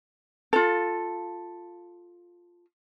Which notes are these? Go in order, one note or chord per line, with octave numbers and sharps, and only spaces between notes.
F4 A4